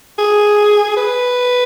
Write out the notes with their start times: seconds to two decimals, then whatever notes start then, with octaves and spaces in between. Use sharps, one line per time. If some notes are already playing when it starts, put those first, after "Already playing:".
0.19 G#4
0.97 B4